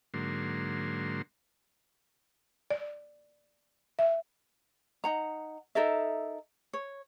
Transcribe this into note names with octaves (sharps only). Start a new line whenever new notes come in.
G#2 D3 F#3 A#3 C6
D5
E5
D#4 F#5 A#5
D#4 A4 A#4 E5
C#5